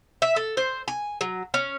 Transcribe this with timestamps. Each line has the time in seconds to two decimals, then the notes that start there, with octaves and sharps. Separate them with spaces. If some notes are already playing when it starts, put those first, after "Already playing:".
0.22 E5
0.36 A4
0.57 C5
0.88 G#5
1.21 F#3
1.54 C#4